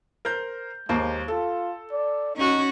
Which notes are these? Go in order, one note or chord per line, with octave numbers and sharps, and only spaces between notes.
A#4 C5 G6
D#2 G#3 A#3 C5
F4 A4
D5
C#4 D#4 F#4